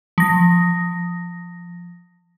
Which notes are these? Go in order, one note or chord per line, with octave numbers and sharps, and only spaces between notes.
F3 A#6